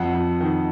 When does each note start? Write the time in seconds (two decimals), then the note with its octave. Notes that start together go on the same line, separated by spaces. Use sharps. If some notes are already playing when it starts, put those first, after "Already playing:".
Already playing: F2 F#5
0.14 F2
0.41 D#3